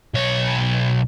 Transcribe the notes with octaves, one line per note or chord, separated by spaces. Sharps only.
B1 C#5